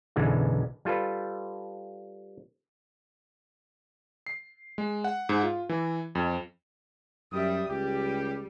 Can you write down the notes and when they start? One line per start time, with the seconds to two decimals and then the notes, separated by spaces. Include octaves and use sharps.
0.16 B1 F#2 D3 E3 G#3
0.85 G3 F4 A4 B4
4.27 C7
4.78 G#3
5.04 F#5
5.29 G#2
5.43 F4
5.69 E3
6.15 F2
7.32 F#2 G3 E5 D#6
7.69 C#2 G3 G4